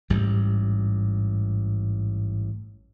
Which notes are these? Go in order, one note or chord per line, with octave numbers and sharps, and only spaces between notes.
A1 G#2 G3